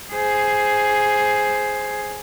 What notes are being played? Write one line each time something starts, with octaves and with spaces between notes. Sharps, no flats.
G#4 C5